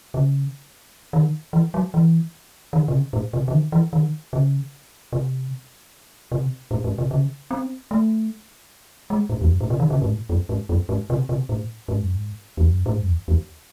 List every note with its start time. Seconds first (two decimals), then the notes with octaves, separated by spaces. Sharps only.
0.14 C#3
1.13 D#3
1.53 E3
1.74 F#3
1.94 E3
2.73 D#3
2.88 C3
2.92 C#3
3.13 A2
3.33 C3
3.48 C#3
3.52 D#3
3.72 E3
3.93 D#3
4.33 C#3
5.13 C3
6.32 C3
6.71 A2
6.84 G#2
6.98 C3
7.11 C#3
7.51 C4
7.91 A3
9.10 G#3
9.29 A2
9.41 E2
9.50 F#2
9.60 A2
9.70 C3
9.80 D#3
9.90 C#3
10.02 G#2
10.10 A2
10.29 F#2
10.49 G#2
10.69 F#2
10.89 G#2
11.10 C3
11.29 C3
11.49 A2
11.88 G#2
12.01 F#2
12.13 G#2
12.57 E2
12.68 F#2
12.86 A2
12.94 G#2
13.01 F#2
13.08 E2
13.28 E2